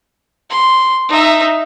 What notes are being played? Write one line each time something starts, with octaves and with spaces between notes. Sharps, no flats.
C6
D#4 E5